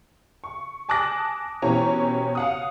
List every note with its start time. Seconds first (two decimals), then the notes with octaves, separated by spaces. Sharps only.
0.44 C#6
0.89 G#5 A5 D6 D#6 F#6 A#6
1.62 B2 E3 C4 C#4 G4 A#5
2.35 F5 F#5 D#6